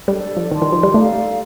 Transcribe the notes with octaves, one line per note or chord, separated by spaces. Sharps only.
G3 D4 A4 D5
F3
D#3 G4 D5 A5 C6
D#3
F3
G3
A3 D#4 A4 D5 F5